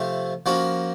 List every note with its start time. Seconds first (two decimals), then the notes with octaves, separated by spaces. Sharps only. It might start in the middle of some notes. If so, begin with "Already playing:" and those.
Already playing: C3 F3 A3
0.46 F3 A#3 C#4 F#4